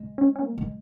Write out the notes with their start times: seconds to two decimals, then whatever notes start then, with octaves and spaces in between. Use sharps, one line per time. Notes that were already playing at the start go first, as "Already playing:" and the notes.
Already playing: G#3
0.18 C#4
0.36 C#4
0.42 A#3
0.58 G#3